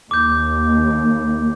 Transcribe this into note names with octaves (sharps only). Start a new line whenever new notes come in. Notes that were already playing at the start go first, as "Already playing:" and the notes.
D#2 D6 G6